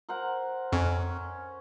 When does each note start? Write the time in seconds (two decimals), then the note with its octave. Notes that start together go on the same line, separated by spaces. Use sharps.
0.09 A#4 C5 F#5
0.72 F2 C#4